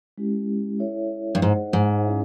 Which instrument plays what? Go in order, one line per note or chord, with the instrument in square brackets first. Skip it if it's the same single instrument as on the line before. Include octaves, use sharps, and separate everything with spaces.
[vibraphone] G#3 C#4 E4 G4
E4 A4 C#5 E5
[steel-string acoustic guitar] G2
[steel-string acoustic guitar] G#2 [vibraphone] D#4 G#4 C5 D#5 F#5
[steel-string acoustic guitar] G#2
[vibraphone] C#4 E4 G#4 C#5 E5